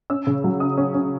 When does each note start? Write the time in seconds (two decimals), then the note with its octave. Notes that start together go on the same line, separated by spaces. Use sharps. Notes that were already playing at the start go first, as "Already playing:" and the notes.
0.10 C#4 E6
0.27 C#3
0.44 F#3
0.60 C#4 D#6
0.77 C#4
0.94 C#4